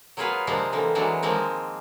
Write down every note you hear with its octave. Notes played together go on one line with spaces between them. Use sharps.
F#3 A#3 F4 G#4 B4 F5
C3 F3 G#3 A#3 C4 D4
D3 E3 A#3 C4
E3 F#3 G#3 A#3 D4
D#3 F3 G#3 A#3 C4